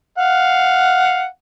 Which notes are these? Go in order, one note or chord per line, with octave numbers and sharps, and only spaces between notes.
F5 F#5